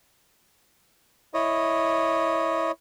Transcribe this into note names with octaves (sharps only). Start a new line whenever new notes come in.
E4 C#5 D#5